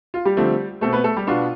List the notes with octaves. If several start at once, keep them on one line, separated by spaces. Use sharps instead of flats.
F4
G3 G4
D3 F3 A3 C4
B2 A3 C4 A4
B3 B4
A3 A4
G3 G4
B2 B3 D4 F4